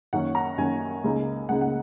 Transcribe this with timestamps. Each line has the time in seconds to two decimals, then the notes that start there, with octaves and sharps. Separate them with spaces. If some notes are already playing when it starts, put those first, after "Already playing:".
0.13 F#2 D#3 A#3 C#4 F#5
0.35 A#5
0.58 F#2 D#3 A#3 C#4 G#5
1.04 C#2 C#3 A#3 D#4
1.49 C#2 C#3 A#3 D#4 F#5
1.61 F#5